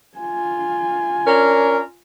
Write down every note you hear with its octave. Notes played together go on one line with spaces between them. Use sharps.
F4 G#5
C#4 D4 A#4